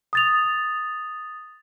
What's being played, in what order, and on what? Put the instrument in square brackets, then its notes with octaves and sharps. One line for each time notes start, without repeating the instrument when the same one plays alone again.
[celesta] D#6 A6 F7